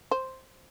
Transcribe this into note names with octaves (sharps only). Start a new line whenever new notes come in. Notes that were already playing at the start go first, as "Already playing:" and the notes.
C5